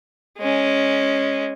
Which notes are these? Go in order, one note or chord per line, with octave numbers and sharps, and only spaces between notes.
G#3 C#4